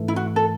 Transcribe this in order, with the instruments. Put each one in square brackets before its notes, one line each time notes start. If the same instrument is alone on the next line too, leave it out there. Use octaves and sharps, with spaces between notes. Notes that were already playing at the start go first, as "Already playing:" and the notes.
Already playing: [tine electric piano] G#2 E3 A3
[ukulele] E4
F#4
A4